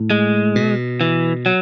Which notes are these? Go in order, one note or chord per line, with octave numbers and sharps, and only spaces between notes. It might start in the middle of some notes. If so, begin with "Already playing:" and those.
Already playing: A2
G#3
B2
E3
F#3